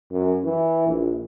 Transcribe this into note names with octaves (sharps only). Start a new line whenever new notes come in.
F#2
E3
A#1